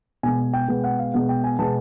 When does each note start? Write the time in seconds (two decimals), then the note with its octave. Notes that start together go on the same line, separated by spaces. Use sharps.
0.23 B2 G#3 B3 G#5
0.53 G5
0.68 B2 G#3 B3
0.84 F#5
0.99 F5
1.14 B2 G#3 B3 F#5
1.29 G5
1.44 G#5
1.59 B2 G#3 B3 A5